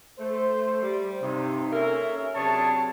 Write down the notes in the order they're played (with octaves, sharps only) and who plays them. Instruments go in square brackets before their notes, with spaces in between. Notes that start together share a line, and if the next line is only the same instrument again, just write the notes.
[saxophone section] A3 [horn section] C5
[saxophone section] G3
[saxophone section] G2 D#4 [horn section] C3
[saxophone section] A#3 A4 A#4 [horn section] C#4 C#5 E5
[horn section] C3 F#3 A5 [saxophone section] D4 G#4 C#5